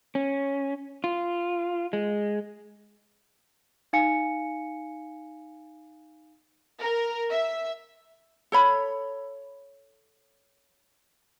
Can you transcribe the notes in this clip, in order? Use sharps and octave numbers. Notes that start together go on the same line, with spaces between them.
C#4
F4
G#3
D#4 F5 G#5 C#7
A#4
E5
A4 C#5 B5